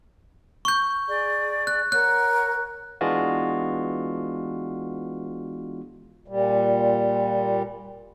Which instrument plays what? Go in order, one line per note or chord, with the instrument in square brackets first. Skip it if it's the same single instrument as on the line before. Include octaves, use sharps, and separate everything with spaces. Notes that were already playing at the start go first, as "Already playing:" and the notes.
[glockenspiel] C#6 G6
[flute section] G#4 D5
[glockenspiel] F#6
[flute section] A#4 C#5 F#5 [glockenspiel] F#6
[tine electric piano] E3 G#3 B3 D4 F4 F#4
[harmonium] A#2 G3